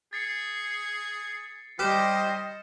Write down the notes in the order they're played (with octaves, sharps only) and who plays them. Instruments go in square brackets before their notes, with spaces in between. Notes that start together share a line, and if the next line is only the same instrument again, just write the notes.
[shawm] G#4 [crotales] A6 C7 C#7
[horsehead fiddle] G3 D#5 [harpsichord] G4 [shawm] C5 [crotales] F6 E7